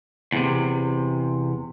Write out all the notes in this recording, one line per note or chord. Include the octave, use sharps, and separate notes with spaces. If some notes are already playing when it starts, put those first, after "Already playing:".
E2 C3